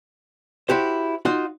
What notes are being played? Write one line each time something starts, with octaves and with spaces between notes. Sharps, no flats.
E4 F#4 G4 C5
D#4 F4 F#4